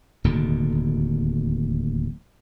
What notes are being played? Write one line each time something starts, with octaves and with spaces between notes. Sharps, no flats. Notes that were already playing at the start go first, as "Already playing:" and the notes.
D1 D#2 B2 D3